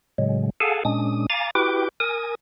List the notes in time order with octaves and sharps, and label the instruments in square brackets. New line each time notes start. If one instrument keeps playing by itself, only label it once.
[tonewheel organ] A2 C#3 F#3 G#3
G#4 A4 F5 F#5 G#5 A5
A#2 G#3 C#4 D4 D#6
F5 G#5 A#5 D6 A6
E4 F#4 G4 B4 G5 D6
A#4 G#5 D#6